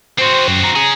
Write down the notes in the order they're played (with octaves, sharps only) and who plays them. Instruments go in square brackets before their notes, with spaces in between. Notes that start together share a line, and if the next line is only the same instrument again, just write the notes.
[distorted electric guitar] C4 F#4 [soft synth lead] C5
[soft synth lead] F#2
A#5
[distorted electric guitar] C#4 G#4